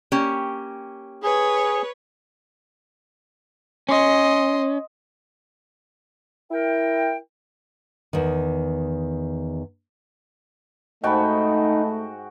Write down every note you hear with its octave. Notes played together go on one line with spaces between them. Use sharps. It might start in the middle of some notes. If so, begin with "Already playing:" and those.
A#3 C#4 G4
G#4 B4 C#5
C#4 D#5 C6
E4 A#4 G5
E2 D#3
G#2 A3 D#4 F#4 D#5 G5 A5 B5